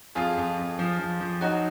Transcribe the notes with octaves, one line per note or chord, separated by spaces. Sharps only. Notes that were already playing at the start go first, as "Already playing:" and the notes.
F2 F4 G#4
F2
F2
F3
F3
F3
F#3 D#4 F#4